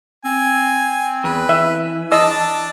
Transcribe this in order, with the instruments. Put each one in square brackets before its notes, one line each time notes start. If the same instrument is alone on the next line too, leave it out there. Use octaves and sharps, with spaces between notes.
[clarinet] C4 [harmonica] G#5
[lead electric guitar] E2 [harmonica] B4
[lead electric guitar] E3 [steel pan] E5
[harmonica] D4 A5 [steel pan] D#5 E6